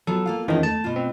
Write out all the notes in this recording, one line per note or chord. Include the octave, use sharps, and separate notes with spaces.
F#3 B3 F4 A4
A#3 F4 F5
E2 D#3 F3 C#4 D#5
A3 A5
B2 F4
C4